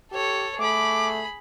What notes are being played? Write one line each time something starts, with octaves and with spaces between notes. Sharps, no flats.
G4 A4 C#5
A3 G#4 B5 D6